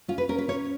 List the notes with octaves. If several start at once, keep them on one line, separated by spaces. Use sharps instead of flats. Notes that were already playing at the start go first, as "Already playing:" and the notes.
C#4 F4
B4
C#4 A#4
B4
C#4 C#5